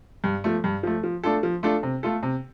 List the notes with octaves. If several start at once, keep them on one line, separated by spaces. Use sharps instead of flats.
G2
F3 A3
G2
F3 A3
F3
A3 D4 F4 A4
F3
A3 D4 F4 A4
C3
A3 F4 A4
C3